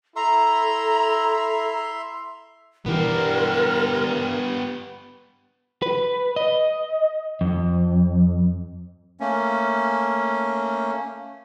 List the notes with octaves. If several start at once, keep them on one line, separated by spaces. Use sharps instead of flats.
E4 A4 E5 A#5 C6
G2 B2 E3 B3 G4 A#4
B4
D#5
F2
A3 A#3 C#4